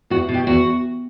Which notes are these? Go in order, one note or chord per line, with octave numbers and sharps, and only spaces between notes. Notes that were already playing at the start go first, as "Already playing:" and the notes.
E2 F#4
B2
G4
E2 F#4